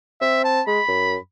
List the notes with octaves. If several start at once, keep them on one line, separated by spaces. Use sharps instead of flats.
C4 E5
A5
G#3 B5
F#2